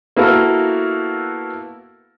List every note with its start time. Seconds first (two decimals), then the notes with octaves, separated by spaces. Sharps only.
0.16 A#3 B3 E4 F#4 A4 A#4